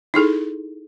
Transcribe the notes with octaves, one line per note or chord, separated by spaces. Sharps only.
D#4 E4 G#4 A4